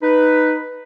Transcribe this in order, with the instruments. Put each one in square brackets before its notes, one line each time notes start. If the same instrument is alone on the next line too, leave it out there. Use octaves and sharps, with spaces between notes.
[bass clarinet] D#4 [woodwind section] B4